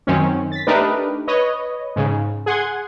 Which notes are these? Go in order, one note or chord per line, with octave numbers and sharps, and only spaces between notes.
F#2 D#3 C4 C#4
A6 B6
A3 D4 D#4 G4 A#4 B4
B4 C#5 D#5
G#2 C#3
G#4 F#5 C6 G#6